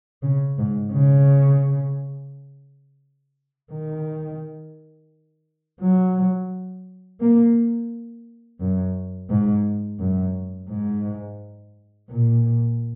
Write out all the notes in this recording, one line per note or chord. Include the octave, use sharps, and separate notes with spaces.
C#3
G#2
C#3
D#3
F#3
A#3
F#2
G#2
F#2
G#2
A#2